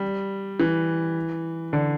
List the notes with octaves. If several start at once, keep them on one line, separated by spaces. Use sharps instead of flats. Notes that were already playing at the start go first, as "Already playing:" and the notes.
Already playing: G3
E3
D3